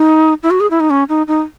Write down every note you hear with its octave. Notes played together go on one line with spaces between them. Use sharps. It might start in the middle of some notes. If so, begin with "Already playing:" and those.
Already playing: D#4
E4
F#4
G#4
E4
D#4
C#4
D#4
D#4